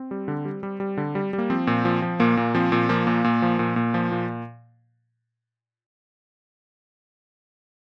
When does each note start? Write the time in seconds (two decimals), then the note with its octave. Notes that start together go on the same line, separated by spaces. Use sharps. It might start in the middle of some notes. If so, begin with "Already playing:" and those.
Already playing: C4
0.11 G3
0.28 D3
0.45 G3
0.63 G3
0.80 G3
0.97 D3
1.15 G3
1.33 G3
1.38 A#3
1.50 F3 C4
1.67 A#2
1.85 F3
2.02 F3
2.20 A#2 A#3
2.37 A#2
2.55 F3 C4
2.72 A#2
2.89 F3 A#3
3.07 A#2
3.24 A#2
3.42 F3
3.59 A#2
3.76 A#2
3.94 F3
4.11 A#2